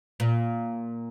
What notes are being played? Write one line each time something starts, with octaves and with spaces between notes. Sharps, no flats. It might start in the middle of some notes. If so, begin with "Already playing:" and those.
A#2